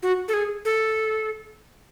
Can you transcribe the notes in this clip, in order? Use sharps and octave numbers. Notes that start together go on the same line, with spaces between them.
F#4
A4
G#4
A4